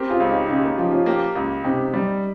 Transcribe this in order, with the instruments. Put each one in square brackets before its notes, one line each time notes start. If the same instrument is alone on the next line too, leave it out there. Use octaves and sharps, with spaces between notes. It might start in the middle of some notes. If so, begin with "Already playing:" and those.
Already playing: [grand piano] C4 [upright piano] G4 A#4
[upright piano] F4 G#4
[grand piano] C#2
[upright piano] D#4 G4
[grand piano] C#3 [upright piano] D#4 G4
[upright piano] A#3
[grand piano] F3 [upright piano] D#4 G4
[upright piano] C#4 F4
[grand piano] A#3 [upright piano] G4 A#4
[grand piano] C#2
[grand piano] C3 [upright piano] D#4 G4
[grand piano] G3